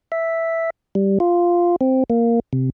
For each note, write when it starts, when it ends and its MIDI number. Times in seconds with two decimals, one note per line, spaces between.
0.12 0.70 76
0.95 1.18 55
1.20 1.76 65
1.81 2.04 60
2.10 2.40 58
2.53 2.70 48